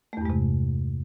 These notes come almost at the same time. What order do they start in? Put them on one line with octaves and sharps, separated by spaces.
A3 E2 G2 G#3 C3